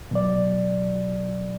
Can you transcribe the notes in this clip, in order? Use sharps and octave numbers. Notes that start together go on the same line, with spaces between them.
B2 F#3 D5